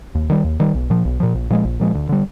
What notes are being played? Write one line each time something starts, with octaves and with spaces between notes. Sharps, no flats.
D#2
D#3 G3
D#2
D#3 G3
B1
A#2 F3
B1
A#2 F3
A#1
A#2 F3 G#3
A#1
A#2 F3 G#3
D2
D3 G3